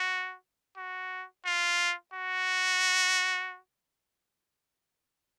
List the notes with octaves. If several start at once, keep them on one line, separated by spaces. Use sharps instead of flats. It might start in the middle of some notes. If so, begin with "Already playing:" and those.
Already playing: F#4
F#4
F4
F#4